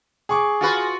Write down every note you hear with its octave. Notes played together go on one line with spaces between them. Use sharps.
G#4 C#6 D6
F4 F#4 B4